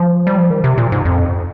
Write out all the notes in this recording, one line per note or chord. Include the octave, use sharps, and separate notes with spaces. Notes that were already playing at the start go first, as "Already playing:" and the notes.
Already playing: F3
G3
F3
D#3
C3
A#2
G#2
F2